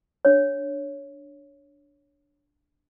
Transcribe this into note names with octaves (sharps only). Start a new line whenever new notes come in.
D4 C#5